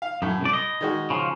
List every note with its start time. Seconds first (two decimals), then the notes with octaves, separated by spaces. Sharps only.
0.02 F5
0.22 F#2 A2
0.41 C2 D5
0.53 D#5
0.81 D#3 G#3 F#4
1.10 C#3 F3